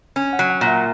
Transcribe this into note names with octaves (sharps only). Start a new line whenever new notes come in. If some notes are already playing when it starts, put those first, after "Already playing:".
C#4
F#5
F#3
F#5
A#2
E5